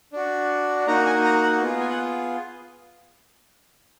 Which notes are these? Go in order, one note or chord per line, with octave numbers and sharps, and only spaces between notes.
D4 F#4
A#3 D#4 F#4 A#5
G#5
A#5
F#5
B3 F4 G#4
G#5
F#5